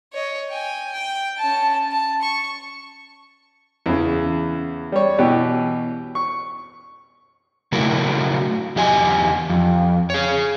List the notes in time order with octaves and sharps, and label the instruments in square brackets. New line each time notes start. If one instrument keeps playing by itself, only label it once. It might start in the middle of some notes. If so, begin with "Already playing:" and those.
[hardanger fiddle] C#5 D#5
G5 G#5
G5
C#4 A5
A5
C#6
[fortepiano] E2 C#3
G3 C#5
B2 E3 G4
C#6
[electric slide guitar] C#3 F#3 A3 E4 F#4 A#4
E2 G4 D#5 G#5
F2
G#4 C#5